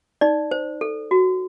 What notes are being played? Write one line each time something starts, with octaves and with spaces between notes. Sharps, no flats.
D#4 D5
C5
A4
F#4